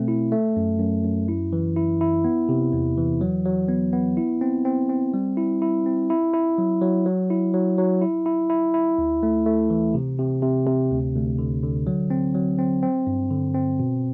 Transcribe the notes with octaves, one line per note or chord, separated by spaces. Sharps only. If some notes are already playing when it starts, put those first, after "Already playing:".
Already playing: B2 A3 C4
E4
A3
F#2
F#2
F#2
E4
E3
E4
E4
B3
C3
E2
E3
F#3
F#3
B3
B3
E4
C4
C4
C4
G3
E4
E4
C4
E4
E4
F#3
F#3
F#3
E4
F#3
F#3
E4
E4
E4
E4
D2
A3
A3
E3
C3
C3
C3
C3
D2
D2
D3
D3
F#3
C4
F#3
C4
C4
G2
D3
C4
B2